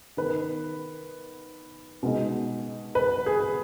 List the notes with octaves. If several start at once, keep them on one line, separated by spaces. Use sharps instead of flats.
D#3 B3 D#4 B4
B2 G#3 D#4
B4
G#4